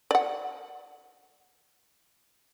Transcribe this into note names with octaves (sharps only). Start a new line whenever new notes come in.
D5 F#5